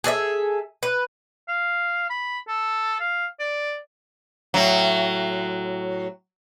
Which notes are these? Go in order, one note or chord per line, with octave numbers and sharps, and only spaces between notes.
G#4 A4 D5 E5
B4
F5
B5
A4
F5
D5
A2 F#3